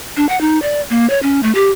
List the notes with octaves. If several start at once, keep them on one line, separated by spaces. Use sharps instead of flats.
D4
F#5
D#4
D5
A#3
C#5
C#4
A3
G4